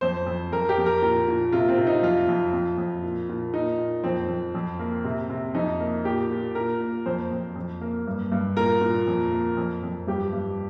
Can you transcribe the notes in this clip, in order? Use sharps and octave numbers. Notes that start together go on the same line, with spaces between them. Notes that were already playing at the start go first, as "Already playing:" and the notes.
F2 C5
F2
F2 A#4
G4
F2
A#4
A#2 A#4
A#2
C3 F4
C4
C3
D#4
F2 F4
F2
F2
F2
A#2
A#2
A#2 D#4
A#2
F2 C4
F2
F2
A#3
C3
C3
F2 D#4
A#3
A#2 G4
A#2
A#2 A#4
A#3
F2 C5
F2
F2
A#3
G2
G2
A#2 A#4
A#2
F2
A#3
F2
F2
G2 G4
G2